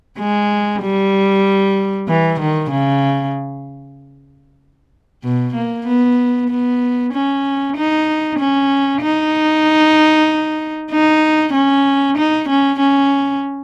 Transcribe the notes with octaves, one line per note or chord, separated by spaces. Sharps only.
G#3
G3
E3
D#3
C#3
B2
A#3
B3
B3
C#4
D#4
C#4
D#4
D#4
C#4
D#4
C#4
C#4